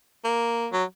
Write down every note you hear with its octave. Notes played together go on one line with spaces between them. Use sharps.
A#3
F#3